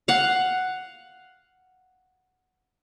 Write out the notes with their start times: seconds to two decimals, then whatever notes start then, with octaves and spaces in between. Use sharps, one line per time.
0.08 F5 F#5